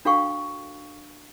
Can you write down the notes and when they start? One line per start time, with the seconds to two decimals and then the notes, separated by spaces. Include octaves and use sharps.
0.05 D4 F#4 A4 F5 G5 C#6